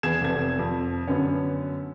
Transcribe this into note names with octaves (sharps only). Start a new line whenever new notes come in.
E2 B3 G#4 G#6 E7
F1 C3 A4 G#6
F2
F#2 D3 B3 C#4